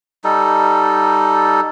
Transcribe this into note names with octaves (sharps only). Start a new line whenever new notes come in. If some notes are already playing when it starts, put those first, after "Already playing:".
G3 D#4 A4